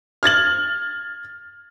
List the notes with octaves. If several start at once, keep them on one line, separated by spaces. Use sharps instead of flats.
F6 G#6 A6 F#7